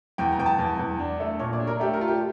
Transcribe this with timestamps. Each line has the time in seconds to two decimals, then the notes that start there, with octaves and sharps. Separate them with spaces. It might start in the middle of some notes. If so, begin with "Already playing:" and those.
0.18 E2 G5
0.32 A#5
0.39 E2 G5
0.46 A5
0.59 E2
0.79 E2
0.99 D4
1.20 A3
1.39 A#2 C#5
1.53 D5
1.60 D4
1.67 A#4
1.80 A3 G4
1.94 A#4
2.01 F4
2.08 G4